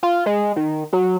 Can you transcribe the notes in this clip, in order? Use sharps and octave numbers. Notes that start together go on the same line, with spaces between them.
F4
G#3
D#3
F#3